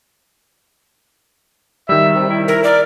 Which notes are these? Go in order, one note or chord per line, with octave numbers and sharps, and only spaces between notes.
D#3 G3 E5
C3
E4
E4 A#4
A#4 D5